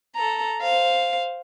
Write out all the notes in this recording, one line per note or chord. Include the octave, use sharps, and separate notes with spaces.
A4 A#5
C5 F5